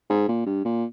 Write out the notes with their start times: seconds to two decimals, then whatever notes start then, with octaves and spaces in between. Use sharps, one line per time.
0.10 G#2
0.28 A#2
0.46 G2
0.65 A#2